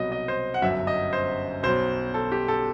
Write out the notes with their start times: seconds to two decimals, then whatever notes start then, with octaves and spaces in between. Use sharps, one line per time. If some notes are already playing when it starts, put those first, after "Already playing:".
Already playing: C2 B2 F#3 D#5
0.12 D#5
0.28 C5
0.54 F#5
0.62 G1 F#2 F#3 E5
0.87 D#5
1.13 C5
1.63 B1 B2 F#3 C5
2.14 A4
2.32 G4
2.48 A4